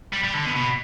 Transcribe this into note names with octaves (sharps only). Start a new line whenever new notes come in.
G3
G3
D3
B2
B2